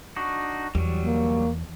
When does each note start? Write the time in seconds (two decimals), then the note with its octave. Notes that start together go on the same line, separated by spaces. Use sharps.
0.16 D4 D#4 F#4
0.75 E2 F#3 G3
1.06 A#3